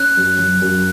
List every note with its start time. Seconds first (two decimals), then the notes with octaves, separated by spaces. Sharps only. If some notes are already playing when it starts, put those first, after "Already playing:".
Already playing: C#4 F#6
0.17 F#2
0.39 F#3
0.62 F#2